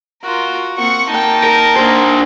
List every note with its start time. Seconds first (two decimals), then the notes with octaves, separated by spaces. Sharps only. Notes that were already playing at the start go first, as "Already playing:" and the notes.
0.23 F4 F#4 A#4
0.77 A#3 C4 F#5 C#6
1.11 A#3 D#4 G5 A5
1.44 A#4
1.76 A#3 D4 A#4 C5